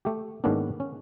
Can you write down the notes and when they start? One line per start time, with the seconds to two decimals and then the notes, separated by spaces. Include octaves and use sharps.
0.05 A3 G4
0.44 G#2 D#3 A#3 B3 C#4 D4
0.80 C#4